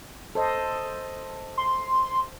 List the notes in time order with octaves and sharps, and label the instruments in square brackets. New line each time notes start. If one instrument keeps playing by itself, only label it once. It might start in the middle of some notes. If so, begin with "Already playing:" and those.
[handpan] A4 C5 D#5
[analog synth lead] C6